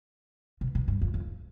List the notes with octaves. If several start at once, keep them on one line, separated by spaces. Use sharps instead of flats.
B2
B2
G2
F2
F2